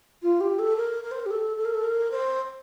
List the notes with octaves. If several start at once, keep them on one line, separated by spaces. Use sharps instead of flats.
F4
G4
A4
A#4
A#4
C5
A#4
G4
A4
A4
A#4
A4
A#4
C5